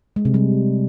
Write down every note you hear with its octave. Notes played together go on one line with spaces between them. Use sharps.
G#3
C3
G3